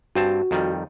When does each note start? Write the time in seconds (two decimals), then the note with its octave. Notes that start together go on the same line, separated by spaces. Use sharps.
0.15 G2 C4 F#4 A5
0.51 F2 D#3 G3